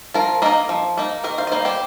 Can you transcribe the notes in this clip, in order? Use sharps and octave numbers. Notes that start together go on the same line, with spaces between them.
F3 F4 A#4
A#3 D#4 A#4 D#5
F3
A#3 D#4
D#3 A#4 D#5
C5 F5
D#5
G3 A#3 D#4 C5 F5
G4 C5